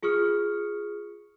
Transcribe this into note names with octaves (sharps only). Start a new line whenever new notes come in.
F4 G#4 C#6 D#6 F6 C#7